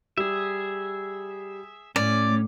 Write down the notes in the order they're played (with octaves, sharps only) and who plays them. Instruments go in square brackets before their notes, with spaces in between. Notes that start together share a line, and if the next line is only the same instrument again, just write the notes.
[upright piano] G3 [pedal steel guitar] G#4 E5
[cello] A2 A3 [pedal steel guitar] C#4 [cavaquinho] D5